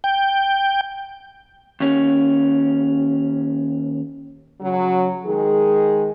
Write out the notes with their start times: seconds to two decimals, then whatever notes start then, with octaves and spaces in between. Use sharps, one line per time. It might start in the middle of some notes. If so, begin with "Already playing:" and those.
0.04 G5
1.80 D#2 C#4
4.60 C#3 F#3
5.26 D#3 G#3 G#4